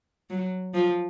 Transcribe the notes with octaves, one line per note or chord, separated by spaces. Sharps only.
F#3
F3